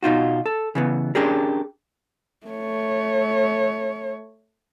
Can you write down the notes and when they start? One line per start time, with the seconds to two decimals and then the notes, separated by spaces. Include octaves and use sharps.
0.03 B2 D#4 F4 F#4
0.46 A4
0.75 C#3 E3 B3
1.15 C#4 D4 G4 G#4 A#4
2.46 A3 C#5